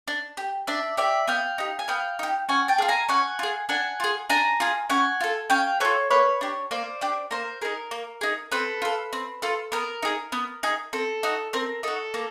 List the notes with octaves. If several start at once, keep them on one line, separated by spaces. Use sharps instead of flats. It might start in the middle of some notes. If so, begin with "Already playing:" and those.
D4
G4
D4 D5 E5
G4 D5 E5
B3 F5 G5
D#4 G4
G#5
B3 F5 G5
D#4 G4
C#4 F#5 G#5
G5 A5
F4 G#4
G#5 A#5
C#4 F#5 G#5
F4 G#4
D4 F#5 G#5
F4 G#4
D4 G#5 A#5
F4 G#4
C#4 F#5 G#5
F4 A4
C#4 F5 G5
F4 A4 B4 C#5
A#3 B4 C#5
D4 G4
A#3 C5 D5
D4 G4
A#3 A#4 C5
D#4 G#4 A#4
A#3
D#4 G#4
C4 A4 B4
F4 A4
C4
F4 A4
B3 A#4
D#4 G#4
B3
D#4 G#4
C4 A4
D#4 F#4
C4 A#4
D#4 F#4 A4
A#3